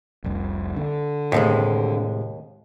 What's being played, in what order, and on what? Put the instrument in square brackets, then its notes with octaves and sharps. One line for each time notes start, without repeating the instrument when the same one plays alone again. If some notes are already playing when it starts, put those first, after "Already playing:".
[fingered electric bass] F1 C2
D3
[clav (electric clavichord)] D#2 [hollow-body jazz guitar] A2 C3 G#3